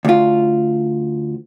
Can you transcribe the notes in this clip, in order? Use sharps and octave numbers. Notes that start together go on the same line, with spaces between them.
D2 F4